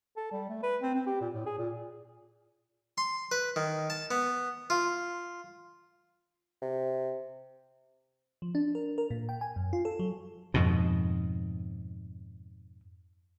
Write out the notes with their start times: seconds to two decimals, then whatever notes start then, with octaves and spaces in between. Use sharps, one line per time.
0.16 A4
0.32 G3
0.49 A3
0.63 B4
0.82 C4
0.94 C4
1.06 G4
1.21 A#2
1.34 A2
1.46 G#4
1.58 A#2
2.98 C6
3.32 B4
3.56 D#3
3.90 A5
4.11 B3
4.70 F4
6.62 C3
8.42 F3
8.55 D4
8.75 A#4
8.98 A#4
9.11 A#2
9.29 G5
9.41 G#5
9.56 F#2
9.73 F4
9.85 A4
9.99 F#3
10.54 F2 G#2 B2